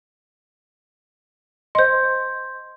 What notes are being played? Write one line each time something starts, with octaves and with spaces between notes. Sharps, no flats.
C5 D#5 C6 G6